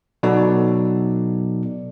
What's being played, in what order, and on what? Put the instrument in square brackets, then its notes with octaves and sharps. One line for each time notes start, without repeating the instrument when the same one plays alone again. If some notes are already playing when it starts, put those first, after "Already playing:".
[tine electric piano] B2 F#3 B3 D#4 A4 D5